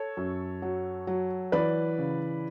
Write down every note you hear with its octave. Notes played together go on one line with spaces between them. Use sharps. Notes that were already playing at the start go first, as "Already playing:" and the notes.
Already playing: A4 C#5
F#2
F#3
F#3
E3 B4 D5
C#3